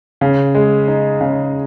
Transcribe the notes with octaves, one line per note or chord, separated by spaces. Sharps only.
C#3
G#3
D#4
C#3